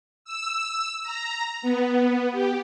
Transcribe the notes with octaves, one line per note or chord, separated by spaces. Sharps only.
E6
A#5
B3
G4